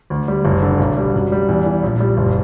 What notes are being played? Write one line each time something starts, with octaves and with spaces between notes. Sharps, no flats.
D2
G3
F#1
D3
B1
G3
F#2
G3
E2
E3
A#1
G3
F#1